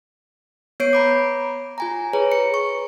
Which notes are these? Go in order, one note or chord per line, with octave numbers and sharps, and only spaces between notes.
B3 C#5 G6 C7 D7
A#5 B5 D6
F4 G#5 A#5
G#4 B4 C#5 A#5
C#7
C#6